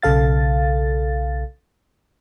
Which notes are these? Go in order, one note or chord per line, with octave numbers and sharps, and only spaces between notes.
B1 C#3 A4 F5 A6